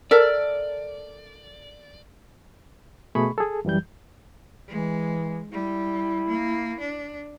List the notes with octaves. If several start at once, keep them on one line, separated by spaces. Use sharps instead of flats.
A4 A#4 D5 E5
B2 A3 G#4 B5 C#6
G#4 A4
F#2 E3 G3 G6
E3 G#3
G3 E4
A#3
D4